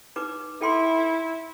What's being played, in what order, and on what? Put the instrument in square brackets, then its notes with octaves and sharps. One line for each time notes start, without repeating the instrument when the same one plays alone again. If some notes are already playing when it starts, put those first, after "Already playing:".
[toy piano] D#4 B4 D6
[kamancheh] E4 [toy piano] A4 G5 C6